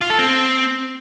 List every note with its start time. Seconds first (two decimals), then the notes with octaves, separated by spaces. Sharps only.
0.01 F4
0.10 A4
0.19 C4